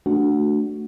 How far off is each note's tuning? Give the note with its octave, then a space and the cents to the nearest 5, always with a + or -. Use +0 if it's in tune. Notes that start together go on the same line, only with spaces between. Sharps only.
A3 +0 D4 +0 F#4 +0